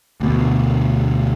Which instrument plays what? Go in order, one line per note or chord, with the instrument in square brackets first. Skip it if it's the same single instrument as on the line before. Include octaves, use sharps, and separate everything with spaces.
[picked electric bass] D2 B2